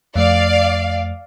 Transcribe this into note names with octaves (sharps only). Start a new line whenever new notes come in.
F2 A3 D5 F5